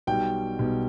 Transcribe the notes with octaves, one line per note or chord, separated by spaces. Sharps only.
B1 B2 G3 G5
B1 B2 G3